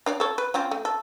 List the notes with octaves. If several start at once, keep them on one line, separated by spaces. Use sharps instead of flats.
D4 C#5 D5
A4 C#5
B4
C4 C#4 F4
A3
A4